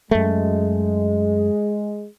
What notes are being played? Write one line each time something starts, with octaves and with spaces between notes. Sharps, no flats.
F#2 G#3 A3